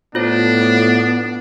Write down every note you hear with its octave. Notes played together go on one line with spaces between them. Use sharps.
A2 B3 D4 F4 C5